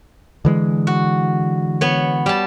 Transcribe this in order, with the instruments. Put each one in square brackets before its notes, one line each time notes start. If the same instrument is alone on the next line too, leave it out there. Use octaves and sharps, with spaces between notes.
[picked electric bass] D3 E3 G#3
[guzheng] F#4
B3 C#5
G3 A5